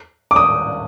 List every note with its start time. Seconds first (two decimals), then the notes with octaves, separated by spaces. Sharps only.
0.31 D6
0.36 D#6